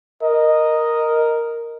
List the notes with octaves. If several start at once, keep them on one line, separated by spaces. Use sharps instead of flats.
A#4 D#5